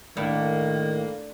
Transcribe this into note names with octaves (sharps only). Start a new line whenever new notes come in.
A2 D#3 A#3 D4 D5